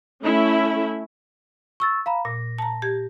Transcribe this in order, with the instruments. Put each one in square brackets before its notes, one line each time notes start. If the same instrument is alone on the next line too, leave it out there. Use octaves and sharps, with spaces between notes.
[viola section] A3 C#4 E4
[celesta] C#6 E6 A6
F5 A#5 B5
[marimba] A#2 [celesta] A#6
[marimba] A5 A#5
G4 G#6